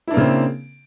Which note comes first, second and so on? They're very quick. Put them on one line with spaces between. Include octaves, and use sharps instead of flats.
E4 D4 A#3 C#3 C4